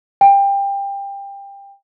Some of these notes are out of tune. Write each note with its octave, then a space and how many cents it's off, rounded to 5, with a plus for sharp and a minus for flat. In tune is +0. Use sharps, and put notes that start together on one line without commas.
G5 +20